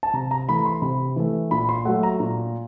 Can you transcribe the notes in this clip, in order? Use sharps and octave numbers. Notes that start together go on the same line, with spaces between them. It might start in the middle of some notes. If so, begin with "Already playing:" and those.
A5
C3 A#5
A#5
E3 A3 B5
C6
C3 B5
E3 A3
A#2 B5
C6
F#3 A3 F#5
A#5
A#2